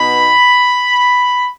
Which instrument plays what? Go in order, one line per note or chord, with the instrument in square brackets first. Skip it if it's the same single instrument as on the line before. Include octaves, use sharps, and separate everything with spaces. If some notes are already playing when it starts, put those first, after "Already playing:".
Already playing: [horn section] B2 B3 D#4 B5